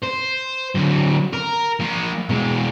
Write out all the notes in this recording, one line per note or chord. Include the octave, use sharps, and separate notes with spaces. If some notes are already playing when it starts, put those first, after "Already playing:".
C5
D3 F#3
A#4
F3 A#3
B2 G#3